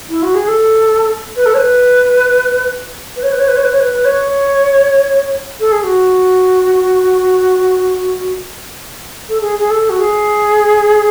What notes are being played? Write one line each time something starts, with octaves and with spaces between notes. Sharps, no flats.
E4
F#4
G#4
A4
B4
A4
C#5
B4
B4
C#5
B4
C#5
B4
C#5
B4
C#5
B4
B4
C#5
A4
G#4
F#4
A4
G#4
G#4
A4
F#4
G#4